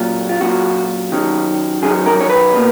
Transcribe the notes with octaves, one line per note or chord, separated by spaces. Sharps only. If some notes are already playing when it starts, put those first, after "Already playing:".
Already playing: A#2 F#3 C#4 F4
F4
A#2 F#3 C#4 F4 F#4
D#3 F#3 C#4
D#3 F#3 C#4 G#4
A#4
C#5
B4
B2 A#3